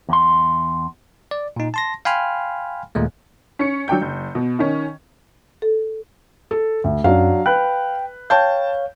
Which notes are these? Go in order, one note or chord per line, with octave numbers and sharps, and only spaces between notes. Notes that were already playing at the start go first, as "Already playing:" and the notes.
E2 C6
D5
A#2 D#4
A5 C6 A#6
F5 G5 G#5 B5 C6 F6
D#2 A#2 G#3 A3
C#4 C#7
F#3 D4 G5 G6
F#1
B2
D#3 C#4
A4
A4
D2
F#2 F#3 D4 F5
B4 G5 B5 F#6
C#5 F5 G5 A5 G6